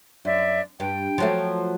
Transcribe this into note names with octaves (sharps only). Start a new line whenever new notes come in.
F#2 D5 E5
G2 G5
F3 F#3 A3